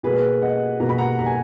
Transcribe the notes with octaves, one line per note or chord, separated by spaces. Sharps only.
B2 A#3 G#4 B4
D#5 F#5
B2 A#3 A#5
B5
F#5 A#5
A#5
G#5